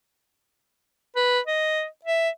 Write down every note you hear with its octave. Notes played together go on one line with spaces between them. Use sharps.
B4
D#5
E5